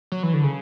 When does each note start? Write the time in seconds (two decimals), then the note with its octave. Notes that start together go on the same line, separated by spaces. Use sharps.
0.12 F#3
0.23 E3
0.34 D3
0.43 C#3